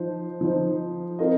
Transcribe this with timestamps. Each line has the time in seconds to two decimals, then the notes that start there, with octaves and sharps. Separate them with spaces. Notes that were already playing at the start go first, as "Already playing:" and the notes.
Already playing: F3 D#4 C5
0.41 F3 D#4 C5
1.19 C4 F4 A#4 D#5